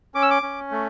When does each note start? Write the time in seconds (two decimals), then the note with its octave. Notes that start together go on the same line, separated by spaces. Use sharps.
0.15 C#4 D6
0.22 E6
0.31 D6
0.43 C#4
0.71 A3